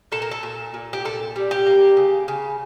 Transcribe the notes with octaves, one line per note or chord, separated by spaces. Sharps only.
A#2 A4
A#4
A4
A#2
A#2
G4
A#2 A4
G3
G4
A#3
C#3
C#3